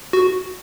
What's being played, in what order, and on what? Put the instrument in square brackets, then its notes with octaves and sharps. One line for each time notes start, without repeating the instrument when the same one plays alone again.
[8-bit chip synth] F#4